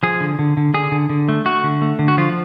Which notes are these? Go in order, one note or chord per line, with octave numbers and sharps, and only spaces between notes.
F3 G#4
D3
D3
D3
D3 G#4
D3
D3
A3
A3 F#4
D3
A3
D3
F#4
F3 F4